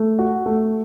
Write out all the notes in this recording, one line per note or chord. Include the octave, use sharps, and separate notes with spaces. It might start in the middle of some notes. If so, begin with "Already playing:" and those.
Already playing: A3
F#4
A3